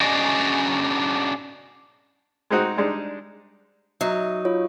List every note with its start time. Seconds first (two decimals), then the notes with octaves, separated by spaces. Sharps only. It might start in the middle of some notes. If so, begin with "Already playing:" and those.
0.01 C#4 D4 F#4 G#4 D5 D#5
2.50 G#3 C4 D#4 F#4
2.77 G3 G#3 D4 D#4
4.01 F#3 D#4 E5
4.45 F4 C#5